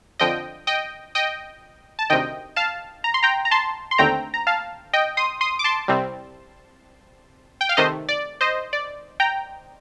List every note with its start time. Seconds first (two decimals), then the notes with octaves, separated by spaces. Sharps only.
0.19 F2 D3 F3 D#5 G5
0.67 D#5 G5
1.15 D#5 G5
1.99 A5
2.10 D2 C3 D#3 D#5 G5
2.56 F5 A5
3.04 A#5
3.14 C6
3.23 G5 A#5
3.45 A#5
3.51 A5 C6
3.91 C6
3.98 D#2 D3 A3 C4 G5 A#5
4.34 A#5
4.47 F5 A5
4.93 D#5 G5
5.17 C6 D#6
5.41 C6 D#6
5.59 D6
5.64 A5 C6
5.88 C2 C3 G3 C4
7.61 G5
7.69 F5
7.77 C3 D#3 A3 C5 D#5
8.09 D5
8.41 C5 D#5
8.73 D5
9.20 G5 A#5